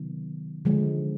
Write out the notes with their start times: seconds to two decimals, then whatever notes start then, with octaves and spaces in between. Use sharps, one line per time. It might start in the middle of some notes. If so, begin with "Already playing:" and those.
Already playing: C3 D#3 F#3 B3
0.65 D3 F3 G#3